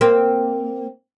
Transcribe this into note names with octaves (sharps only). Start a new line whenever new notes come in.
A#3 C4